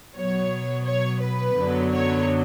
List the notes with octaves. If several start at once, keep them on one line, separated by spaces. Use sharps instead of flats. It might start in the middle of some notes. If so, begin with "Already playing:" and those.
B2 F#3 B3 C#5
C#5
B4
F#2 D3 F#3 B3
C#5